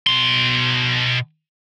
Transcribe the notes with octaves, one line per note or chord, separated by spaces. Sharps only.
B2 C6